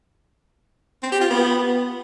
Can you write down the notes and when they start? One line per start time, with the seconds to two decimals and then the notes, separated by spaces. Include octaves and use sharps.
1.03 C4
1.12 G4
1.21 F4
1.30 B3